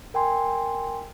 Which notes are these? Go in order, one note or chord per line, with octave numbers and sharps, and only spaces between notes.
A#4 G5 G#5 C6